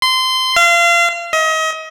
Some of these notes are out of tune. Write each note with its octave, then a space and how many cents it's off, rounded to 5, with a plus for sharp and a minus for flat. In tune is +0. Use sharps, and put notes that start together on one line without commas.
C6 -20
F5 -30
D#5 +35